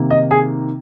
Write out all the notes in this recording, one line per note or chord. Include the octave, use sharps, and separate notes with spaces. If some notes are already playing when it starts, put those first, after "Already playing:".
Already playing: C3 D#3 A#3
D#5
G#4